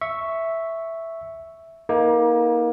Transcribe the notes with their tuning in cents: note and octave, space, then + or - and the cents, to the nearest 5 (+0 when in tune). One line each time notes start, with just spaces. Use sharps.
E5 +0 C#6 +0
A#3 +25 D#4 +35 A4 +0